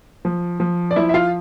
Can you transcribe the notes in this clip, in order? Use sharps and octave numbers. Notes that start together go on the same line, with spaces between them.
F3
F3
D5
F3 E4 E5
E5
F4 F5